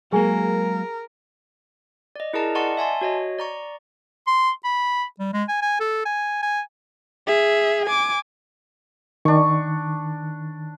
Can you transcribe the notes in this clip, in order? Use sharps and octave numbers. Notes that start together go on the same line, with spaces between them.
F#3 G#3 A#3 G#4 A#4 G#5
D5 D#5
E4 G#4 A#4 A5 A#5
D5 D#5 F#5 A5 C6 C#6
E5 G#5 A5 C6
F#4 C#5 D#5
D5 A#5 C#6
C6
B5
G3
G#3
G#5
G#5
A4
G#5
G#5
G#4 E5
G#5 D6
D#3 D4 C#6